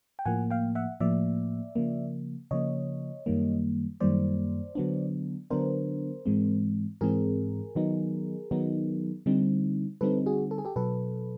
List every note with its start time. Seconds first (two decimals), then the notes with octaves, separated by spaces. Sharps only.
0.19 G5
0.25 A2 F3 A#3 F#5 G#5
0.50 F5 G5
0.75 E5 F#5
1.00 A2 F3 A#3 D5 E5
1.76 C#3 F3 A#3
2.51 C#3 F3 A#3 C#5 D#5
3.26 F#2 D#3 G3 A#3
4.00 F#2 D#3 G3 A#3 C5 D5
4.75 D3 F#3 B3 D4
5.50 D3 F#3 B3 D4 A#4 C5
6.26 G#2 E3 G#3 C4
7.01 G#2 E3 G#3 C4 G#4 A#4
7.75 D#3 F#3 B3 D#4
8.51 D#3 F#3 B3 D#4
9.26 D3 G3 C4 D#4
10.01 D3 G3 C4 D#4 A4 B4
10.26 F#4 G#4
10.51 A4
10.58 G#4
10.65 G4 A4
10.76 B2 F#3 A4 B4